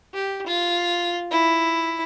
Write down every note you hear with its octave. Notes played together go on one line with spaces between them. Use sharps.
G4
F4
E4